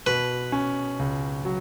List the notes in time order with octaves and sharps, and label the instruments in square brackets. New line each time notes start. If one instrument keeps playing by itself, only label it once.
[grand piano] B2 [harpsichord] B4
[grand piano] C#4
C#2
F#3